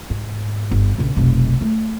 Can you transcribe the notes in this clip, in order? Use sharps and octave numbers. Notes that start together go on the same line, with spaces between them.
G#2
G1
A#1 C#3
F1 B1
A3